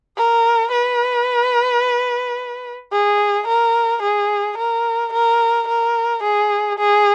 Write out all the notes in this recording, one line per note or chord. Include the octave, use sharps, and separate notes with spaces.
A#4
B4
G#4
A#4
G#4
A#4
A#4
A#4
G#4
G#4